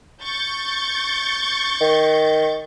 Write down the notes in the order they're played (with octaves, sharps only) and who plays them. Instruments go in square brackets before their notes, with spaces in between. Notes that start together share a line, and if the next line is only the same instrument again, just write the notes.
[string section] C#6 G6 A6
[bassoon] D#3